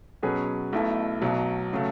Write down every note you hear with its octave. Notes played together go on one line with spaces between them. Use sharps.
B2 F#3 C#4 G#4 B4
B1 B2 A3 E4
B1 B2 F#3
C#3 F#3 A3